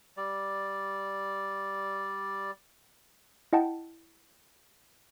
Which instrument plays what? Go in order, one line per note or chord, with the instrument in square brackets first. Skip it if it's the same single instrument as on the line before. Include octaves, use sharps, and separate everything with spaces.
[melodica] G3 D5
[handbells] E4 D#5 F#5 G5 A5